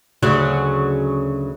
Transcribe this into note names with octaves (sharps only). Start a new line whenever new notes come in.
D2 C#3 F#3